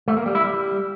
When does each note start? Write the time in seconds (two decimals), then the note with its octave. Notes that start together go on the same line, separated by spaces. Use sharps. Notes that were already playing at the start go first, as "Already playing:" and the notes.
0.08 A3
0.17 A#3
0.26 G3
0.35 E4
0.44 G3